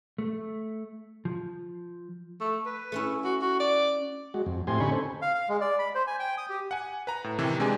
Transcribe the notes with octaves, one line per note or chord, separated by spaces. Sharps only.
A3
F3
A3
B4
A3 C#4 E4
F#4
F#4
D5
G#3 F#4
F2
A2 C4 G4 G#5 C6
D3 C#4 D#4 G#5 B5 C#6
A4 C5
F5
F5
G#3
D5
B5
C5
G#5
G5
D#6
G4
F#5 G#5
B4 A#5
A2
C3 D#3 E3
C3 G#3 D4 G4 G#5